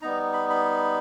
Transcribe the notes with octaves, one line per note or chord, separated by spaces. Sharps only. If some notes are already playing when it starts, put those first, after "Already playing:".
G3 B3 D#4 A#5
B5
B5